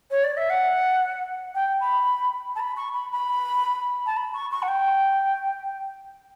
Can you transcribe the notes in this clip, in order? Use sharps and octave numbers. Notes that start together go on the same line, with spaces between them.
C#5
D5
E5
F#5
G5
B5
A5
B5
C#6
B5
B5
A5
B5
C#6
C#6
F#5
G5